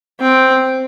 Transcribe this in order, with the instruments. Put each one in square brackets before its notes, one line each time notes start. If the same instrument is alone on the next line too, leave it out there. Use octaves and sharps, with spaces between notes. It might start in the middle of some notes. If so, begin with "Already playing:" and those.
[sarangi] C4